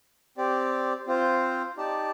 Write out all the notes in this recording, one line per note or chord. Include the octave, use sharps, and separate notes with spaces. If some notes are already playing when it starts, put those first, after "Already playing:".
C4 G4 D5
C4 F4 C5
D#4 G4 D5 A5